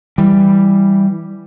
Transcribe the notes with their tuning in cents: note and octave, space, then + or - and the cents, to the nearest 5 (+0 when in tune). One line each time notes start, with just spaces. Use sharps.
E3 +0 G3 +0